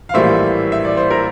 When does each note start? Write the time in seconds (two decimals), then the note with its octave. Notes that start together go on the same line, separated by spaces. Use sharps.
0.09 F5
0.14 A#1 A2 E3 G3 A#3 C5 E5
0.72 E5
0.85 D5
0.97 C5
1.11 A#4